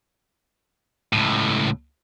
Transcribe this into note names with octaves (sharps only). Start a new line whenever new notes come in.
C#2 A2